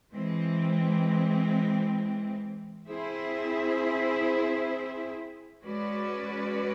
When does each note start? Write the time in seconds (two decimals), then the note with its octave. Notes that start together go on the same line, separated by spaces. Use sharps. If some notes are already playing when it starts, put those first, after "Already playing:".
0.14 E3 G#3 C4
2.88 C4 E4 G#4 C5 E5
5.63 G#3 C#4 F#4 B4 D5